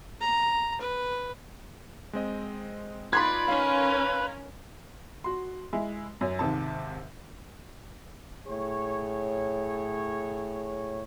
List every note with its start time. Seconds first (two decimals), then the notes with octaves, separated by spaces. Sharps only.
0.21 A#5
0.81 B4
2.13 G#3 C4 D#5
3.13 D#4 F4 B4 D5 B5 C6 G#6
3.48 C#4 D#4 A#4 F5
5.24 F#4 C6
5.73 G#3 E4
6.21 F#2 C#4
6.39 D#2 G#2 C3 A5
8.47 A2 G#4 C#5